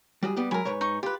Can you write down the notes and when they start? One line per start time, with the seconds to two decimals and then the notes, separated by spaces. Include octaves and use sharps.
0.23 G3 F#4 G#4
0.36 G3 B3 G4
0.51 F#3 G#3 A#4 G#5 B5
0.65 G#2 B4 C#5
0.81 D#4 C#6
1.03 F4 G4 B4